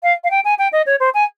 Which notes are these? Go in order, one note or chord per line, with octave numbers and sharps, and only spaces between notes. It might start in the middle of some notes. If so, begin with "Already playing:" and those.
F5
F5
G5
G#5
G5
D#5
C#5
C5
G#5